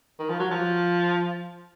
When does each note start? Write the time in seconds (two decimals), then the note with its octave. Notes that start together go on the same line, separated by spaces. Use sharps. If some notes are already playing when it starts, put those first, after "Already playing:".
0.19 D#3
0.29 F3
0.40 F#3
0.51 F3